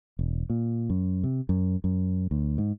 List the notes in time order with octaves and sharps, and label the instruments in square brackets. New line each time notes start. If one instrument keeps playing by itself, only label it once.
[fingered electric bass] E1
A#2
F#2
C3
F#2
F#2
D2
G#2